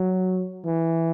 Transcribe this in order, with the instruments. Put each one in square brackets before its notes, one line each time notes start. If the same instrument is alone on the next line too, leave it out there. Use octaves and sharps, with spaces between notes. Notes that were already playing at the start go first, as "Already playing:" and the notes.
Already playing: [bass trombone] F#3
E3